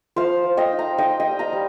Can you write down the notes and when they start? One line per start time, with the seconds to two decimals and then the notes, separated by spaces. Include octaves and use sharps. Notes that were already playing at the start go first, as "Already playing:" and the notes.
0.16 F3 C5 F5
0.44 F3
0.57 D#5 G5
0.72 D#4
0.79 F5 A#5
0.98 D#4 D#5 G5
1.20 D#5 G5
1.27 G3
1.39 F5 A#5
1.53 G3